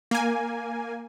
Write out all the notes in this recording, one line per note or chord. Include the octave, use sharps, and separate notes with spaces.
A#3 G#5